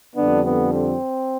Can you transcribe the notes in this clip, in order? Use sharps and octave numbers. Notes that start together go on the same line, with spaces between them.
F2 D3 G3 B3 D4
B3
C4